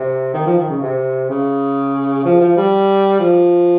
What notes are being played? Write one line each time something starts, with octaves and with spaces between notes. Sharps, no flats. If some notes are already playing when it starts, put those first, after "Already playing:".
Already playing: C3
D#3
F3
D#3
C#3
C3
C#3
F3
F3
G3
F3